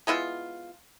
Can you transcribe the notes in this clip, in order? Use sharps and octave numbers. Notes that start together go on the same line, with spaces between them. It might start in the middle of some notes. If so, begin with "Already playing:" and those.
G#3 B3 E4 F4